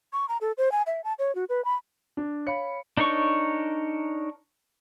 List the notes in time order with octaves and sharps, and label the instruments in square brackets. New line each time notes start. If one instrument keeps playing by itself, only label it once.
[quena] C#6
A#5
A4
C5
G#5
E5
A5
C#5
F#4
B4
B5
[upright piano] D4
[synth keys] C#5 F5 B5 [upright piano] C#7
[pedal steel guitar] D4 D#4 A#4 C#5 C#6